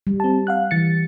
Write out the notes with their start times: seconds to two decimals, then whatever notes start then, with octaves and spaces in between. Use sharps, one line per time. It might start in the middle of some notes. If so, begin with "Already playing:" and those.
0.07 G3
0.20 C4 A5
0.47 F5 F#5 F#6
0.71 E3 A6 C#7